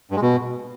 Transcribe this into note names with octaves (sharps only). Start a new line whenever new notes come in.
G2
G#3
B2